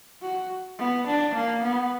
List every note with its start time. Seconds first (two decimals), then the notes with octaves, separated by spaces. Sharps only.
0.21 F#4
0.78 B3
1.07 D4
1.35 A#3
1.63 B3